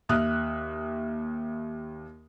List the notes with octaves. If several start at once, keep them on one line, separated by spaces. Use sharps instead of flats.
D#2 E5 D#6 F6 F#6